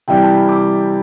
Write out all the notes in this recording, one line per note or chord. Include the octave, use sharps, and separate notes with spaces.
C3 E3 G3 G5
A5
B5
D6